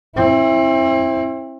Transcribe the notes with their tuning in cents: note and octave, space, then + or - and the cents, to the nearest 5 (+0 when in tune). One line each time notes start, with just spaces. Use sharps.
C4 +35 E4 +0